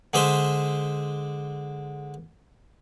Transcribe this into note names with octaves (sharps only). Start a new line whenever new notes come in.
D3 G#3 G#4 C5 E5 C6